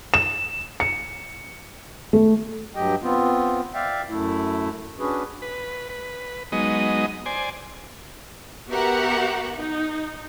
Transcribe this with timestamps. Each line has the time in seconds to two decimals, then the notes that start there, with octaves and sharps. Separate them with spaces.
0.14 E7
0.80 C#7
2.13 A3
2.75 G2 F#3 G4 D#5 G5
3.02 B3 C4 F4
3.74 D5 E5 F5 G5
4.09 F#2 A3 E4
4.99 C#4 D4 F#4 G#4 B4
5.42 B4
5.89 B4
6.52 F#3 G#3 B3 D#4 D#5
7.26 C5 D5 G#5
8.69 B3 F#4 G4 A#4 E5 F#5
9.55 D#4